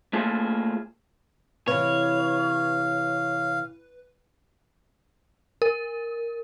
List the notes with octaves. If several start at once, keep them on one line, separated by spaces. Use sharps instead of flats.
A3 A#3 F4 G#4
C3 E3 B4 C#5 F5
A#4